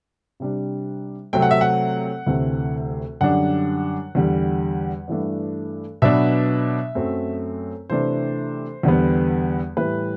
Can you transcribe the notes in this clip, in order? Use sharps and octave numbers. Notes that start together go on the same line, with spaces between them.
C3 G3 D4
C3 F#3 A3 C4 G5
F#5
E5
F#5
D2 C3 E3 A3 C4
F#2 D3 G3 D4 F#5
E2 D3 G3
G2 E3 A3 D4
B2 F#3 B3 D4 E5
F#2 F#3 A3 C4
C3 E3 A3 D4 C5
E2 D3 G3 B3
A2 E3 G3 B4